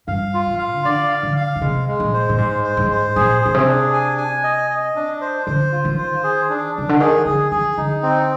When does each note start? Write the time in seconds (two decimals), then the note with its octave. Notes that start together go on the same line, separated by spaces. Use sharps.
0.08 G2 F5
0.34 F4
0.47 G#2
0.59 F5
0.76 D#3
0.85 D3 D5
1.11 F5
1.23 D3
1.37 F5
1.56 A#2
1.62 C3 G#3
1.88 G#3
2.00 A#2
2.13 C5
2.29 A#2
2.38 G#2 G#3
2.64 C5
2.77 G#2
2.90 C5
3.16 A#2 G#4
3.41 A#2 G#4
3.54 C3
3.68 D4
3.93 G#5
4.18 G#5
4.44 D#5
4.70 D#5
4.96 D4
5.21 C5
5.46 D3 C5
5.72 F4
5.85 D#3
5.98 C5
6.24 G#4
6.49 D4
6.75 C3 D4
6.89 D3
7.00 D#3 G#4
7.26 D3 G#4
7.52 D#3 G#4
7.77 D3 D#4
8.03 C4